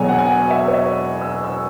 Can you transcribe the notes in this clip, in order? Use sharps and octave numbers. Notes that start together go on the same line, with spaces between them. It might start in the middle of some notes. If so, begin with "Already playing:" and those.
Already playing: E1 E2 B2 F#3 C#5 G#5
F#5
G#5
F#5
E5
C#5
E5
E6
E6